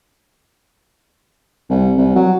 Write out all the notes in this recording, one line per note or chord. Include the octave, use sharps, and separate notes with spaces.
C2
C2
F#3